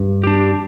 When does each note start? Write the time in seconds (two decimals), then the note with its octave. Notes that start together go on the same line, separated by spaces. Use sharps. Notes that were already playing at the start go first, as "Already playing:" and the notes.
Already playing: G2
0.24 D4 G4